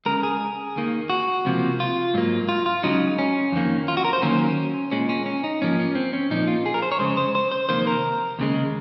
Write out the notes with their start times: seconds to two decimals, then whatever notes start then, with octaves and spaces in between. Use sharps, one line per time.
0.06 C#2 C#3 G#3 A#4
0.23 G#4
0.76 D#2 D#3 A#3
1.10 F#4
1.45 C#2 C3 F3 A#3
1.80 F4
2.14 G#2 F#3 A#3
2.49 F4
2.66 F4
2.83 C#2 C#3 F#3 D#4
3.19 C#4
3.52 F2 D#3 A#3
3.88 F4
3.97 F#4
4.05 A#4
4.13 C5
4.22 D#2 D#3 F#3 A#3 C#4
4.91 A#2 G#3 C#4
5.09 C#4
5.26 C#4
5.44 D#4
5.61 G#2 F3 A#3 C#4
5.79 C#4
5.95 C4
6.13 C#4
6.30 A#2 F3 A#3 D#4
6.48 F4
6.66 G#4
6.74 A#4
6.82 C5
6.92 C#5
6.99 F2 C#3 G#3 C5
7.17 C5
7.35 C5
7.51 C5
7.69 F2 C3 D#3 A#3 C5
7.87 A#4
8.39 D#2 C#3 G#3